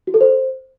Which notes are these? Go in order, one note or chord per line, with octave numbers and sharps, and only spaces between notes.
F#4
A4
C5